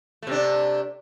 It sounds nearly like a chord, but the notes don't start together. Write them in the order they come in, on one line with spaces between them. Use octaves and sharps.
A3 C3 D4